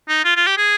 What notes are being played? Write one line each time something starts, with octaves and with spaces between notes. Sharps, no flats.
D#4
F4
F4
G4
G#4